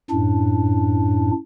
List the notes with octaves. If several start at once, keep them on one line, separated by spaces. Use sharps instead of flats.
F#2 A2 D4